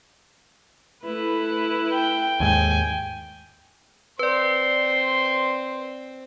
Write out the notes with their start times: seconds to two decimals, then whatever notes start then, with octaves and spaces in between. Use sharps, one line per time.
1.04 A3 E4 B4
1.93 G5
2.40 D#2 G#2 G5 G#5
4.19 C4 B4 D5 C6